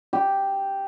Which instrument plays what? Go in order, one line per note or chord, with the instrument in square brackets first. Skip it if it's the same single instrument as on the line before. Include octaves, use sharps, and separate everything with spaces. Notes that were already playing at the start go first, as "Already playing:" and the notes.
[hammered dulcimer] G4